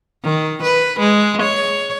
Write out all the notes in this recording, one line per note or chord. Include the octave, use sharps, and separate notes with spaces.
D#3
B4
G#3
C#5